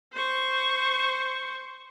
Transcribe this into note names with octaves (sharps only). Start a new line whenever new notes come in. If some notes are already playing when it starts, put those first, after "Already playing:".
C5 C#6